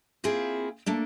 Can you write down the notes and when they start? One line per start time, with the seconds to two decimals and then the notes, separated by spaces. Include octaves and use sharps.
0.24 A#3 C4 E4 F4 G#4
0.86 A3 A#3 D4